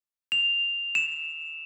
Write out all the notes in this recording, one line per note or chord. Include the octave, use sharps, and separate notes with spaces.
F7
E7